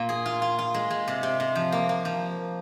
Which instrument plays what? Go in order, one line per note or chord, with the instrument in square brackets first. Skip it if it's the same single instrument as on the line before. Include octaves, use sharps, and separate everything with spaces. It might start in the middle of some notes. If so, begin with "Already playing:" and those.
Already playing: [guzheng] A#2 A#3
G#4
F4
F4
F4
G#3
G#3
C3
C3
C3
F3
A#3
A#3
F3